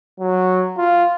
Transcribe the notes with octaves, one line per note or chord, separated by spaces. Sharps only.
F#3
F4